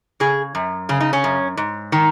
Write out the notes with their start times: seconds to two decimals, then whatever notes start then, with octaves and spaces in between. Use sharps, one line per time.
0.20 C#3 G#4
0.55 F#2
0.89 C#3 C#4
1.00 D#4
1.13 C#4
1.24 F#2
1.57 G#2
1.92 D#3